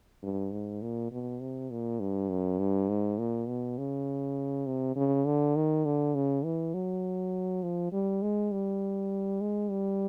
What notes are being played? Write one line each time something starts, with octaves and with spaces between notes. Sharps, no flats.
G2
G#2
A#2
B2
C3
A#2
G2
F#2
G2
G#2
A#2
B2
C#3
C3
C#3
D3
D#3
D3
C#3
E3
F#3
F3
G3
G#3
G3
G#3
G3